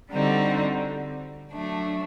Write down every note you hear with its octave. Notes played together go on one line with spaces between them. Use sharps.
D3 G3 C4 D#4 F#4
F#3 A3 D4